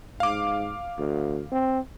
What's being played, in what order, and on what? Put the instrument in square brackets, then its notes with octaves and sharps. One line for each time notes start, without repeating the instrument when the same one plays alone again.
[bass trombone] G#2 [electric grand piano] F5 D6
[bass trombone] D2
C4